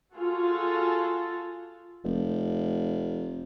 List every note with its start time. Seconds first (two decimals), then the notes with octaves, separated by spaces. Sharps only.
0.15 F4 F#4 G#4 A4
2.04 F1